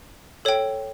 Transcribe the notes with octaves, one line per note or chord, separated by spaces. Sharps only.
A4 C#5 G5